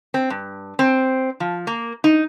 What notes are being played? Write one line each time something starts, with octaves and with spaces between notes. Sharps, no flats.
C4
G2
C4
F3
A#3
D#4